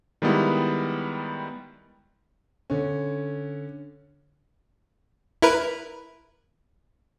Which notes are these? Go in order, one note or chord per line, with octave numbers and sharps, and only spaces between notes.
D#3 G3 G#3 B3 E4
D3 C#4
E4 A#4 B4